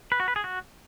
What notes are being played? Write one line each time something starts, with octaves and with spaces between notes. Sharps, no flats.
B4
F#4
B4
G#4
F#4